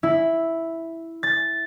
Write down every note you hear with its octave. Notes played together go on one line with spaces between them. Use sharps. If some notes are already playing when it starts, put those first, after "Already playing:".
E4
A6